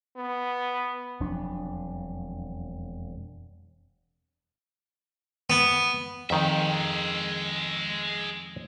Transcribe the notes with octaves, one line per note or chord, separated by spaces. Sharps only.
B3
E1 F2 F#3 D4
B3
F2 D#3 G#3 E5